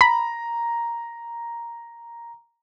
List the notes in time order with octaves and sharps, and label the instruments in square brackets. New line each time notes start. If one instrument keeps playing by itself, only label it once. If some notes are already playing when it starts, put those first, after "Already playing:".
[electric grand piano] A#5 [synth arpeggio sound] B5